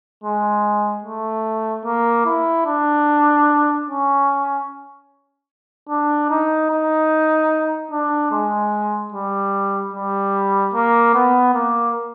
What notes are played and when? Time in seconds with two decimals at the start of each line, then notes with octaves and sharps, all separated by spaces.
0.24 G#3
1.04 A3
1.85 A#3
2.26 E4
2.66 D4
3.87 C#4
5.89 D4
6.30 D#4
6.70 D#4
7.91 D4
8.31 G#3
9.12 G3
9.94 G3
10.74 A#3
11.14 B3
11.54 A#3